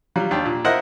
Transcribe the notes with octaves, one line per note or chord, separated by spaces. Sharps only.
F#3 G3 F4
D#2 D4 G5
A#2
E4 F4 A#4 C5 D#5 F#5